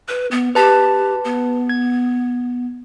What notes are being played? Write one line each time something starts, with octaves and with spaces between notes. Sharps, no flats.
B4
B3
G4 B4 A5
B3
G#6